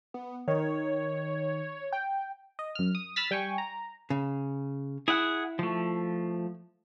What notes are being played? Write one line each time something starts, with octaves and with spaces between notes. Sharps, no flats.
B3
D#3 C#5
G5
D#5
F#2 F6
D#6
B5 E6 F6 A6 B6
G3 G5 G#5 C#6
A#5
C#3
E4 G#4 F#5
F3 A3